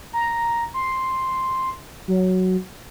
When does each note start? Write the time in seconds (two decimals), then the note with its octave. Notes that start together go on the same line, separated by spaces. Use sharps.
0.13 A#5
0.74 C6
2.08 F#3